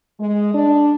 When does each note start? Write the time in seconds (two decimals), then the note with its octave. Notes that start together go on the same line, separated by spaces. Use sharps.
0.20 G#3
0.54 D4